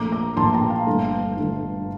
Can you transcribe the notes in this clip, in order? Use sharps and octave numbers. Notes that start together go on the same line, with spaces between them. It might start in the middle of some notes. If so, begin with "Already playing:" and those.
Already playing: A#1 A#2 A3 A#5 D6
A#5 D6
A#1 A#2 A3 A5 C6
G5 A#5
F5 A5
G1 G2 D3 A3
G1 G2 D3 A3